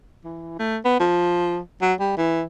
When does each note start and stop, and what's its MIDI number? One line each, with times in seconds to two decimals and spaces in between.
0.25 0.57 52
0.59 0.78 57
0.85 0.98 59
1.00 1.59 53
1.82 1.94 54
2.00 2.13 55
2.18 2.43 52